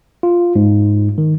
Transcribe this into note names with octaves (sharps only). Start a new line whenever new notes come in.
F4
G#2
D#3